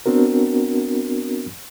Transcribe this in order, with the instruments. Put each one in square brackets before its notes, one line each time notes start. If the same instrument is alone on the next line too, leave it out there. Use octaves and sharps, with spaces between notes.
[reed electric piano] B3 C4 D4 F#4 A#4